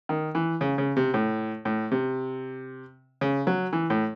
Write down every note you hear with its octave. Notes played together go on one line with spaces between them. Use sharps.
D#3
E3
C#3
C#3
C3
A2
A2
C3
C#3
F#3
E3
A2